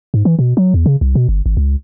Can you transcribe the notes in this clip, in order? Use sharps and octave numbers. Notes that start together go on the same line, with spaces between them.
G#2
E3
B2
F#3
E2
C#3
C2
B2
G1
G#1
C#2